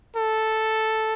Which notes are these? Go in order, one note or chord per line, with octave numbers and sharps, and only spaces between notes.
A4